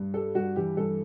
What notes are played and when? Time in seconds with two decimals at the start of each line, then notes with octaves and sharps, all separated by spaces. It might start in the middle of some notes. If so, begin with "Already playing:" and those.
Already playing: G2
0.14 G3 A4
0.35 G2 F#4
0.56 E3 G4
0.77 G2 A4